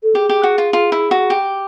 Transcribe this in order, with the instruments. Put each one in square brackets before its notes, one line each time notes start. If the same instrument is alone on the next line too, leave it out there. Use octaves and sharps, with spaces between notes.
[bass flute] A4
[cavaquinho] G4 [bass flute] G#4
[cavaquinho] G4
F#4
F4
F4
E4
F#4
G4